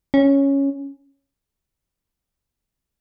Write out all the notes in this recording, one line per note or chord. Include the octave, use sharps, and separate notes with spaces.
C#4